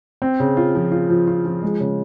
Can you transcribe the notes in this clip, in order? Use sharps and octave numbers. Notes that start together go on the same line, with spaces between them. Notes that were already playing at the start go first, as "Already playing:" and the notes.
C4
C#3
F4
F3
F4
F3
F4
F3
G#3
C#3